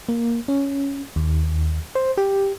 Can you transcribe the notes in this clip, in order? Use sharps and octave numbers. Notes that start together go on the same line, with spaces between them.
A#3
C#4
D#2
C5
G4